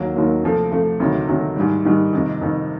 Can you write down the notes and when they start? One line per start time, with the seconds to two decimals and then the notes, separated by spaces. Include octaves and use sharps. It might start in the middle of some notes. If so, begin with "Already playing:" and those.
Already playing: D#2 D#3 F#3 A#3
0.15 D#2 D#3 F#3 A#3
0.43 C3 F3 A3
0.71 C3 F3 A3
1.00 D2 C3 D#3 F#3
1.28 D2 C3 D#3 F#3
1.56 G#2 D#3 G3
1.85 G#2 D#3 G3
2.13 F2 C3 D#3
2.41 F2 C3 D#3